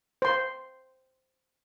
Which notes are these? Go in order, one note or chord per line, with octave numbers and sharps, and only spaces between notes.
C5 C6